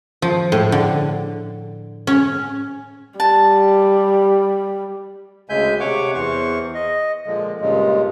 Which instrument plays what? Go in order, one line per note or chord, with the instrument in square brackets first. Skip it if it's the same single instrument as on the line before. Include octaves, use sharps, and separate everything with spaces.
[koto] F3
A2
D3
C#4
[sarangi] G3 [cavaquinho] A5
[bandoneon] D2 C#3 G#3 E5 G#5 G6
C3 C#5 F#5 C#6 D6
E2 E3 C5 C#6
D#5
A#2 D3 F3 G#3
G2 A#2 C#3 G#3